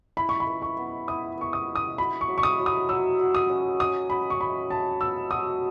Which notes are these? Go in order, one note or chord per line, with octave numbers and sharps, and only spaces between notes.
E4 B5
C#6
B5
B4
C#6
B3
E4 D#6
B3 C#6
D#6
E4
D#6
F#4 B5
C#6
F#3
C#6
D#6
F#3
D#6
F#3 E6
F#4
D#6
C#4
C#5 D#6
F#4 B5
C#6
E5 B5
C#5 A5
B3 E6
F#4 D#6